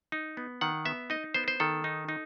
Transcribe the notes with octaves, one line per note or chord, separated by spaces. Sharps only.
D#4
B3
D#3 F#5
B3 E5
D#4 D#5
B3 C5
C5
D#3 A4
D#4
D#4